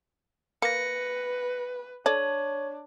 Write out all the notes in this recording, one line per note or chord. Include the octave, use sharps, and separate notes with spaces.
A#3 B4 A#6 C#7
D4 A4 C#5 D5